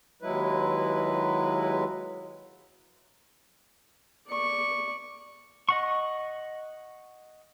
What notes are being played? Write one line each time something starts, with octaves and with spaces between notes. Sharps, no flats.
D#2 F#3 G#3 E4 B4
D5 C#6
D#5 F#5 C#6